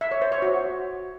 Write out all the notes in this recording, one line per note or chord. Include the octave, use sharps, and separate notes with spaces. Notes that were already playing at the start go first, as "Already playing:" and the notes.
E5
C#5
C5
C#5
F#4